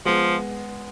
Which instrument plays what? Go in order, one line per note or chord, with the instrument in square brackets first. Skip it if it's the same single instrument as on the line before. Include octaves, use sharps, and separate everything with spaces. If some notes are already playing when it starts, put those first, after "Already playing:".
[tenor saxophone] F3 [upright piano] G#3 B3